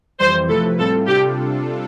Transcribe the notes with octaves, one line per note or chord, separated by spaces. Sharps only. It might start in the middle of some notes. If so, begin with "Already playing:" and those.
F2 E3 G3 C5
C3 F3 A3 E4 A4 B4
A2 G3 C4 F4 A4
C3 G3 D4 F4 G4 A4